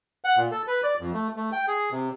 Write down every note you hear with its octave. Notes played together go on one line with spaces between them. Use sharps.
F#5
A#2
A4
B4
D5
F2
A3
A3
G5
G#4
C3